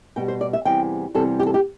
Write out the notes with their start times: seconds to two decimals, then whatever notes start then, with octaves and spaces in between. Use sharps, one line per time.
0.16 B2 G3 G5
0.28 C5
0.41 D5
0.53 E5
0.65 E2 C3 G3 G5
1.15 E2 C3 G3 A4
1.40 G4
1.46 A4
1.54 G4